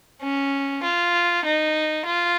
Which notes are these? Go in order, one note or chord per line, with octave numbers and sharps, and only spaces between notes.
C#4
F4
D#4
F4